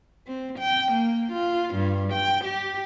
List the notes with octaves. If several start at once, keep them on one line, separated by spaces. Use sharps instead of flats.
C4
G5
A#3
F4
G2
G5
G4